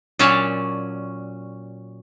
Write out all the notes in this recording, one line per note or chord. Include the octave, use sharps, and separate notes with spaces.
A#2 F#3 C#4 C#5 D5 A5